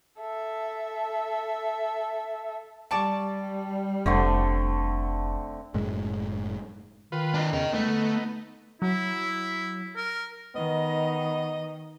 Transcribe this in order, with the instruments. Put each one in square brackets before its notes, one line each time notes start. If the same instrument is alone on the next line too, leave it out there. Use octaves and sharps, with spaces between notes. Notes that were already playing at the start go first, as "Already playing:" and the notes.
[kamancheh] A4 E5
[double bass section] G3 [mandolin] D5 A5 C#6
[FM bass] F1 [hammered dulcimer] D3 A3 C4
[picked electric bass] F#1 F#2 A2 G#3
[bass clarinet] D#3 [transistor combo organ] F4 B4
[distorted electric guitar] D4 D#5
[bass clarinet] E2 [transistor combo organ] C#3 [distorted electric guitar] A#4 D#5
[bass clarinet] G#3 [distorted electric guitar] A3 [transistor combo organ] B3 D#4
[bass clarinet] D3
[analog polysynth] F#3 [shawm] E4
[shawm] A#4
[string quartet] D#3 [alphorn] B3 [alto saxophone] D#5